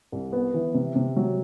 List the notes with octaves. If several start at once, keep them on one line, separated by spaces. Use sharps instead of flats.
C2
B3
E3
C3
C3
F#3